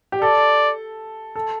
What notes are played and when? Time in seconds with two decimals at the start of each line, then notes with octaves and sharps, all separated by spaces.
0.12 G4
0.22 A4 D5
1.36 A4